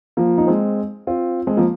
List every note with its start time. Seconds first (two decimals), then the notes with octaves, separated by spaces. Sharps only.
0.17 F3 A#3
0.38 D#4
0.47 G#3 C4
1.07 C4 F4
1.47 G#3 C4
1.57 F3 A#3